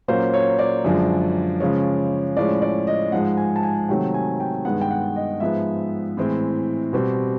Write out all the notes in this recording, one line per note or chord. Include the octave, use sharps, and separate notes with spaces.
A#2 F#3 A#3 C#4 C5
C#5
D5
F#2 D3 F3 G#3
C#3 F3 G#3 C#4
A2 F3 G#3 C#4 D5
D5
D#5
G#2 F3 G#3 F#5
G#5
A5
G#5
C3 D#3 F#3 A3 C4 G5
G#5
G5
G2 D#3 G#3 B3 F#5
G5
F#5
D#5
G#2 F3 G#3 B3 E5
A2 E3 G#3 C4
B2 G3 C4